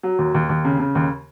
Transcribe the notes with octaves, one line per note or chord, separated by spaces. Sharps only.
F#3
D#2
D#2
D#2
C#3
C#3
D#2